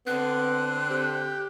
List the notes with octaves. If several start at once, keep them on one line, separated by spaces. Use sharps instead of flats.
D3 B3 C4 F#6
G4